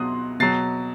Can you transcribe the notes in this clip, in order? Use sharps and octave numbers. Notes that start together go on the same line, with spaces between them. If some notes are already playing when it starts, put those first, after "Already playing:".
Already playing: B2 F#3 C6 D#6 F#6
B2 F#3 A6 C7